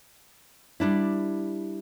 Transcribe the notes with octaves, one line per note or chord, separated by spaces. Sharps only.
G3 D4 E4